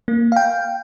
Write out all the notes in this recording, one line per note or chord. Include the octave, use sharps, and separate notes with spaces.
A#3
F5 G5